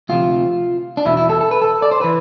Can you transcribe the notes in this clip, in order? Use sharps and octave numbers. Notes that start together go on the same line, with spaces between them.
D2 C3 F3 F4
D4
E2 B2 E4
E4
A4
A4
B4
A4
D5
C5
E3 B4